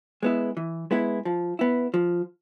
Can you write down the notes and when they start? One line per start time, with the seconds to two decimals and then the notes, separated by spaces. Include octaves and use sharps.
0.23 G#3 B3 E4
0.57 E3
0.91 G#3 B3 E4
1.25 F3
1.59 B3 E4
1.94 F3